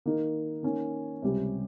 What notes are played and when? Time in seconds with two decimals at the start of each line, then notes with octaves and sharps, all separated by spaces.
0.06 D#3 A#3 D#4 A#4
0.63 D#3 A#3 C#4
1.22 C#2 C3 G3 C#4 G4